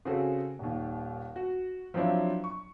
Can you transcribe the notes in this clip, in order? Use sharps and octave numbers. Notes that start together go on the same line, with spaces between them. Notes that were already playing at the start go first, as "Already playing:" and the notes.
C#3 C4 F#4 G#4 A4
D#1 D#2
F#4
F3 F#3 C4 D4 E4
C#6